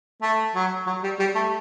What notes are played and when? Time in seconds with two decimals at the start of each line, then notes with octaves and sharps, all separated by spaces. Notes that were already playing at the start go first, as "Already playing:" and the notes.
0.22 A3
0.55 F#3
0.87 F#3
1.04 G3
1.19 G3
1.35 A3